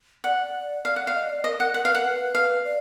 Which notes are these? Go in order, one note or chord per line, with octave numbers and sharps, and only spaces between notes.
D5 F#5
F5
F#5
F5
D#5
D5
A#4 D#5
A#4 F#5
A#4 F#5
B4 F5
A#4 F#5
B4
F5
D5